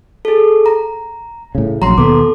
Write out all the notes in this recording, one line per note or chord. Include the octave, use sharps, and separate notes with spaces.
G#4 A4
A#5
A2 C#3
A#1 F#3 A#5 C6
D#2 B2 B3 A4 D6